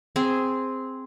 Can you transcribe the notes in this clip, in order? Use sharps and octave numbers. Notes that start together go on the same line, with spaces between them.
C4 G#4